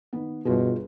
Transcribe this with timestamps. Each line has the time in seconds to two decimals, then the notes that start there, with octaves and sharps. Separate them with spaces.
0.13 D#3 B3
0.45 G1 B2 F4 G#4